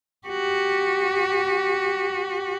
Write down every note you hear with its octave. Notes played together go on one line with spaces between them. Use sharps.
F#4 G4